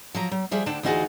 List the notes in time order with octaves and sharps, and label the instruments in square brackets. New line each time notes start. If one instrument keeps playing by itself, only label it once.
[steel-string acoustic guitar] F3 F#3 A#5
F#3
F3 G3 G#4 E5
D2 D3 D4 G5 A5
D2 E3 D#4 F4 F#4 G#4